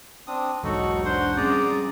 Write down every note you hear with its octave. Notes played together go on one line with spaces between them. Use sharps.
C4 D4 D#6
B1 E2 G#2 F#3 D#4 F#4 A4
D4 C5 F#5
G3 C4 C#4 G#4 D5 A#5 D#6